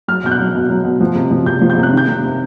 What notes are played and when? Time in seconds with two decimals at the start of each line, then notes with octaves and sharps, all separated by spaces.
0.08 F#3 F6
0.24 B2 G6
0.31 F#6
0.39 F#3
0.54 B2
0.70 F#3
0.85 B2
1.00 F3
1.15 C3
1.31 F3
1.46 C3 G6
1.61 F3
1.70 G6
1.78 C3
1.83 F#6
1.93 D#3 G6
2.08 C3
2.23 C3